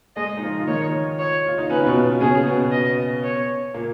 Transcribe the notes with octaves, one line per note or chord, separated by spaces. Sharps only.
G#3 G#4 D#5
D#4
F3 F4
F4
D#3 D#4 C#5
C#5
F4
D#4
C#3 C#4 B4
B2 B3
C#3 C#4 G#4
B2 B3
D#5
C#5
A#2 A#3